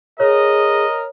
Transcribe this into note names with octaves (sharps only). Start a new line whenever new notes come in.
G#4 A#4 C#5 D#5